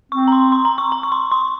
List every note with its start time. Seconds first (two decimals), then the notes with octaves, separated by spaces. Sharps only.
0.12 C4 C#6
0.28 A#5
0.32 C6
0.52 C6
0.65 A#5
0.78 C#6
0.92 A#5
1.03 C#6
1.12 C6
1.32 C6